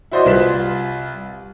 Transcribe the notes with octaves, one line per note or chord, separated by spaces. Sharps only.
E4 F#4 C5 D5 D#5 C6
C2 F4 B4 B6 E7